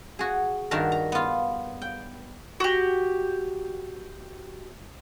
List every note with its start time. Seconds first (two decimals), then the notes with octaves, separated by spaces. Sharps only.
0.19 F#4 G#4
0.71 G2 D#3 D4 F#4 A#4
0.92 A#5
1.12 B3 F4
1.82 G5
2.60 F#4 G4